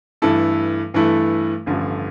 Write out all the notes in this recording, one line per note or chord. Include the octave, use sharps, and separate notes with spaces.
G2 E3 A3 E4 A4
G2 E3 A3 E4 A4
A1 G2 D3 F3 A3